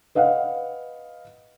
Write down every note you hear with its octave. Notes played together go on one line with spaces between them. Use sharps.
B4 D#5 F5 F#5